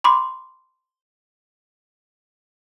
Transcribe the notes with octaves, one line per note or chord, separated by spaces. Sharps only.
B5 C6 D6